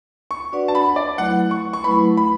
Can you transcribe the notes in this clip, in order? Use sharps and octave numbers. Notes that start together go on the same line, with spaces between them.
C#6
D4 F#4 B4 D5 F#5
A5
B5
D5
F#3 A3 E4 B4 F#5
C#6
C#6
F#3 A3 E4 B4 B5
B5